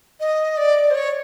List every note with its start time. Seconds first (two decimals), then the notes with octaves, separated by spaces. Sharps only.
0.20 D#5
0.57 D5
0.90 C5
0.95 C#5